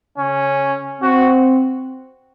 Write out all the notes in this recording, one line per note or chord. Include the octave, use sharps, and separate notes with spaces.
C#3 C#4
C4 F#4